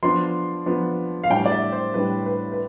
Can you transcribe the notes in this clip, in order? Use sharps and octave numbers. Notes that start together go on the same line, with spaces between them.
F3 B3 D4 C6
F3 B3 D4
F5
A2 G3 D4 G5
D5
E5
C5
A2 G3 D4 B4
B4
B4